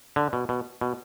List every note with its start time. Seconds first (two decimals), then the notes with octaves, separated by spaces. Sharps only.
0.16 D3
0.33 B2
0.49 B2
0.81 B2